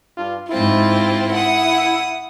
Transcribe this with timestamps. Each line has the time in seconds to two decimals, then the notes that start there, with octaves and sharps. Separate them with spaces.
0.18 G2 D4 F4
0.50 G#2 C4 E4 F4
1.32 F#5 D#6